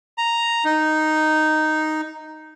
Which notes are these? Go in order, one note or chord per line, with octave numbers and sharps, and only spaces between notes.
A#5
D#4